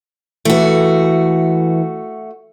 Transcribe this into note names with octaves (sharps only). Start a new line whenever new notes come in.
E3 A3 F#4